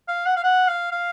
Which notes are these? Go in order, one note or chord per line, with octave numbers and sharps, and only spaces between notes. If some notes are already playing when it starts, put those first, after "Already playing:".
F5
F#5
F5
F#5
F5
F5